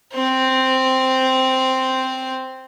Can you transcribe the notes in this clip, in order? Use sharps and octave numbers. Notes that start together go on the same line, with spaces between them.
C4 C5